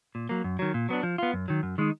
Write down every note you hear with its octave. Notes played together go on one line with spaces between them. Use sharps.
A#2
F#3 A#3
F#2
D#3 F#3
A#2
F#3 B3 D4
F3
B3 F4
F#2
D#3 F#3
F#2
D#3 G#3 D#4